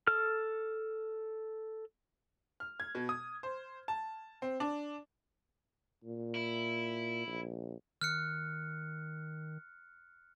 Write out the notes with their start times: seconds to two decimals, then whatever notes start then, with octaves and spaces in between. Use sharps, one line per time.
0.07 A4 F6
2.60 F6
2.80 G#6
2.95 B2
3.09 D#6
3.43 C5
3.88 A5
4.42 C4
4.60 D4
6.04 A#2
6.35 E4
7.27 A#1
8.01 D#3 F6 F#6 C#7